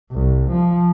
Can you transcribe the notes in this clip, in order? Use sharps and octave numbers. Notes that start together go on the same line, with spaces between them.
C2
F3